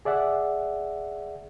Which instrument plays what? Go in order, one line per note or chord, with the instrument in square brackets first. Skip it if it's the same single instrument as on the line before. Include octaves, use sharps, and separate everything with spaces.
[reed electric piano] G#4 D5 E5 F#5